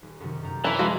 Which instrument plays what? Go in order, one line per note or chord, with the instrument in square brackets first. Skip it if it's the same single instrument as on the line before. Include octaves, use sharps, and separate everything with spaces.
[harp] D#1
F#2 C3 D#3
F#2 A#5 G6
[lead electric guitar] E3 [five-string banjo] E4 A5
[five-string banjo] F3 G#3 F#4